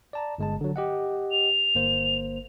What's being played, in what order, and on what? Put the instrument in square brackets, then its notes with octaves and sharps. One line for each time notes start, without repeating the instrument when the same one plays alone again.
[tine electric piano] D5 A5 A#5
G1 G#3 A5
D3 F#3
G4 D#5 F#5
[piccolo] F7
[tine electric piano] G1 A#3 C5